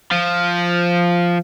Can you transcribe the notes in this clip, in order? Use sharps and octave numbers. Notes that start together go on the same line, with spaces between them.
F3